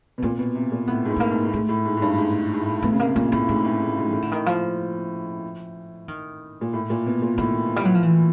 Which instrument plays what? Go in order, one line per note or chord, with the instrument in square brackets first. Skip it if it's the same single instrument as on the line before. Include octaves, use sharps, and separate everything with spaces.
[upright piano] B2
[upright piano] A#2 [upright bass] C4
[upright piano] B2
C3
A#2
[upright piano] A2 [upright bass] B3
[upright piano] G#2
A2
[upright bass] A3
A#3
[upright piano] G#2
A2
[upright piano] G#2 [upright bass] A3
[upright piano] A2
G#2
G#2
G2
G#2
G#2
A2
[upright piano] B2 [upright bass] A3
[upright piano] C#3
[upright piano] C3 [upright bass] A#3
[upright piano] A#2 [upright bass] A#3
[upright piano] A2 [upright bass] A#3
[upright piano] G#2 [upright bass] A3
[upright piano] A2
G#2
G#2
[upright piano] A2 [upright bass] D#3
[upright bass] D3
D#3
F3
D#3
[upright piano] A#2
A2
A#2
B2
A#2
[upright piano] A2 [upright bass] D#3
[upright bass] G3
F#3
F3
E3